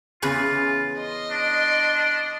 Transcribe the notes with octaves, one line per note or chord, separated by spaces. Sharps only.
E2 C#3 F4 B4
D#5 C6
D4